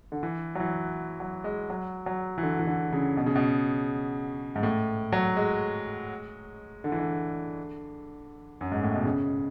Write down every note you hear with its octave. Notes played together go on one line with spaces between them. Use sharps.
D3
E3
F#3
E3
F#3
G#3
F#3
F#3
E3
D3
E3
D3
C#3
B2
C#3
B2
G#2
A2
F#3
G#3
D3
E3
D3
F#2
G#2
A2
B2
C#3